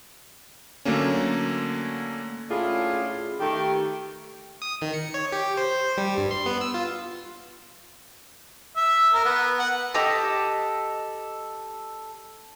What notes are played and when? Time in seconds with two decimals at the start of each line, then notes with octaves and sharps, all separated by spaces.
0.85 D3 F#3 A3 A#3 C#4
2.50 A2 C#4 D4 E4 F4 G#4
3.40 D#3 A3 G4
4.62 D#6
4.82 D#3
4.94 C#7
5.14 C#5
5.32 G4
5.57 C5
5.97 G3
6.17 G2
6.31 C6
6.46 B3
6.61 E6
6.74 F4
8.77 E5
9.14 A#4
9.25 B3
9.59 F#5
9.94 G4 A4 D#5